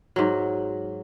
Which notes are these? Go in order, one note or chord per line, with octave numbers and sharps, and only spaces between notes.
G#2 F#3